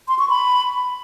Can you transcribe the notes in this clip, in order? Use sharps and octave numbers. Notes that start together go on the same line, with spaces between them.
C6
C#6
B5